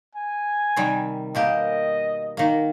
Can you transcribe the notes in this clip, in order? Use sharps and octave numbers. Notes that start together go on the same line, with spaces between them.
G#5
C3 D#3 G3
B2 A#3 G4 D#5
D#3 A#3